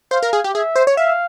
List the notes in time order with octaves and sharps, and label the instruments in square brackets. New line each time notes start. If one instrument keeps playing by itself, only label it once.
[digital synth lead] C5 [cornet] F5
[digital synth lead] A#4
G#4
G4
[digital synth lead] G#4 [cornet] E5
[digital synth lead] C5
C#5
[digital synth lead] E5 [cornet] F5